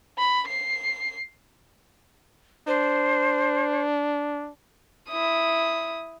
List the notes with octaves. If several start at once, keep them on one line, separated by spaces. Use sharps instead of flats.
B5
C7
D4 C5
E4 D#6